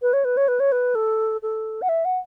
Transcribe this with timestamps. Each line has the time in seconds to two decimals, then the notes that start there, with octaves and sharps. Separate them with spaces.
0.02 B4
0.13 C#5
0.24 B4
0.37 C#5
0.48 B4
0.60 C#5
0.72 B4
0.95 A4
1.42 A4
1.82 F#5
1.89 E5
2.05 F#5